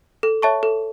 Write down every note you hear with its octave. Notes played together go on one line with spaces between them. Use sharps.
A4
C#5 E5 A5 C#6
A4